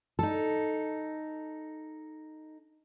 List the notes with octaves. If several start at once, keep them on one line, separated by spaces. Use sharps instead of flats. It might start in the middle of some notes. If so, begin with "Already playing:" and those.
D#4 A4